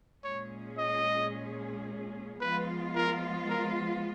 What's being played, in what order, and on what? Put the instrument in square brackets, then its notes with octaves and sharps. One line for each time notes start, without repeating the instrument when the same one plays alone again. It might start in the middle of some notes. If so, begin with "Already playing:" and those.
[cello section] A#2 G#3 C#4 G#4 [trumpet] C#5
[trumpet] D#5
[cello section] F3 G#3 B3 F4 [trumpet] B4
[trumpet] A#4
A#4